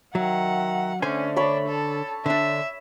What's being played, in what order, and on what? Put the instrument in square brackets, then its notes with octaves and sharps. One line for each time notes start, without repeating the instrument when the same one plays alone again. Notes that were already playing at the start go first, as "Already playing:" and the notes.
[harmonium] D#3 E5 A#5 [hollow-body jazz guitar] F#3 [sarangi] F#5
[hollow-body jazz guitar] D3 C5 G#5 [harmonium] A3 D5 [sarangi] C#4
[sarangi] D4 [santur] C#5 B5
[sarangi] A4 [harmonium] A5
[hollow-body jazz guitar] D3 D4 [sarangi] E5